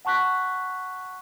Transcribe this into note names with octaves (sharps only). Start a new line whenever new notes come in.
F#5 A5 C#6 F#6 B6